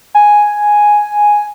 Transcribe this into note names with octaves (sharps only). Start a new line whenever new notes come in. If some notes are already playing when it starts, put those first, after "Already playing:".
G#5